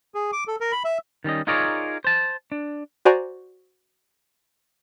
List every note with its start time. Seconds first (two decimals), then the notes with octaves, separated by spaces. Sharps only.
0.15 G#4
0.33 D6
0.48 A4
0.61 A#4
0.72 B5
0.84 E5
1.24 D#3 G3 C#4 D#5
1.47 D#4 F4 G#4 A#4 C#5 D5
2.04 C5 A5
2.52 D4
3.05 F#4 C5 D5 G#5 A#5